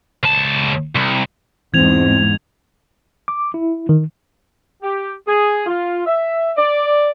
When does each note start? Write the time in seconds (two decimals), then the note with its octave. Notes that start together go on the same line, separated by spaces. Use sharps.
0.23 C#2 A5
0.96 C2
1.74 E2 G#2 E3 C4 G#6 F7
3.28 D6
3.54 E4
3.89 D#3
4.82 G4
5.28 G#4
5.66 F4
6.06 E5
6.56 D5